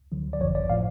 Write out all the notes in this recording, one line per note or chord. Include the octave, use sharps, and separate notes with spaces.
D2 D3 F#3
D5
G#1 F#2 F3 C#5
D5
A2 F3 F5